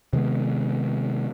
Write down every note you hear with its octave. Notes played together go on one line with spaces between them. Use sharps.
C3 D#3 G#3 B3